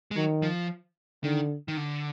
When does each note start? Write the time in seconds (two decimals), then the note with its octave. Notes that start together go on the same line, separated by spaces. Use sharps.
0.11 G#3
0.16 D#3 F#3
0.42 F3
1.24 D3 D#3
1.68 D#3
1.77 D3